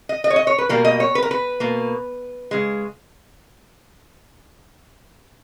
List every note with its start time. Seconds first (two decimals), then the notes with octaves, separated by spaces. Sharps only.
0.09 D#5
0.24 D#5
0.30 C#5
0.36 D#5
0.47 C#5
0.58 B4
0.69 B2 G3 A#3 A#4
0.85 D#5
1.00 C#5
1.15 B4
1.23 A#4
1.31 B4
1.60 B2 A#3
2.51 C#3 G#3